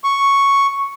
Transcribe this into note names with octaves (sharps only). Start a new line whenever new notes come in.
C#6